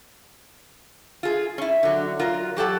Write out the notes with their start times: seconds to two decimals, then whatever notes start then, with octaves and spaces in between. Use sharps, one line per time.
1.23 F4 G#4
1.58 C#4 E4
1.83 D3 F#3
2.19 F#3 F4 A#4
2.57 F#3 G4 A4 F#5